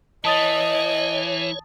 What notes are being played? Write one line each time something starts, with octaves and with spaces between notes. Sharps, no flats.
E3 C#5 D#5 A5 D#6 A6